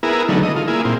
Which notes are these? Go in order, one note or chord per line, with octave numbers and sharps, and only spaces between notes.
B3 E4 G#4 A#4
D3 D#3 F#3 A3 B3
D#5
F4
A#3 E4 G#4
A#2 C4